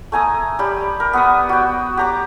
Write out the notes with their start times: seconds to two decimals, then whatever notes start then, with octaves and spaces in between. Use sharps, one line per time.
0.12 A3 G#5 A#5 D#6
0.59 G3 G4
1.00 A#4
1.13 B3 C#6 D#6
1.49 F#4 G5
1.97 G4 A#5 D6